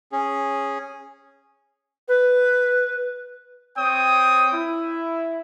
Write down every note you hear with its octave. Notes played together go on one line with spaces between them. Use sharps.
C#4 G#4
B4
C4 C#5 G5 D#6
E4